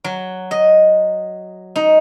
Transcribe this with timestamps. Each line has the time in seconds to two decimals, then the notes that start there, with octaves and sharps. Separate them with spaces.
0.04 F#3
0.51 D#5
1.76 D#4